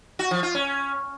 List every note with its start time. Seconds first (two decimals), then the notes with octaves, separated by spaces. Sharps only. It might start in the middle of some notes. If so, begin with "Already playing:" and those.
0.19 F#4
0.31 F3
0.43 F4
0.55 C#4